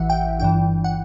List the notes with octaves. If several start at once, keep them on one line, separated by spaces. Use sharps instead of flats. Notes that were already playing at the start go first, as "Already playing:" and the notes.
Already playing: A1 E3 E5 F#5
G5
G1 G2 E3 G5
F#5